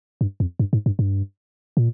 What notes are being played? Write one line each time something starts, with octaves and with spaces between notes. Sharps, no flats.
G2
F2
G2
G#2
G2
G2
A#2